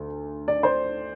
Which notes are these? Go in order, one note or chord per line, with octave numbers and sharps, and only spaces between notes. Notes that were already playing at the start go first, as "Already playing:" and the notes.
Already playing: D2
D5
C5